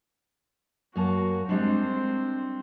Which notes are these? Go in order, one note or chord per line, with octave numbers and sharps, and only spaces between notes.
F#2 A#3 F#4 A5
G3 G#3 C4 D4 C5